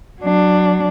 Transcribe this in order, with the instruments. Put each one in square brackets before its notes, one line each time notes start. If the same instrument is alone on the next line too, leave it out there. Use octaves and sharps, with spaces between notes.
[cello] F#3 D4